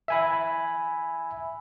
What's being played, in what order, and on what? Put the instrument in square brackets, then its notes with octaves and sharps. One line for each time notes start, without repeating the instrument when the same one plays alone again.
[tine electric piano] E5 G#5 B5